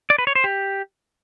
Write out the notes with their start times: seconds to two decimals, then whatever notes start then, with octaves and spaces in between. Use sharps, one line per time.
0.10 D5
0.18 B4
0.27 C#5
0.35 C5
0.44 G4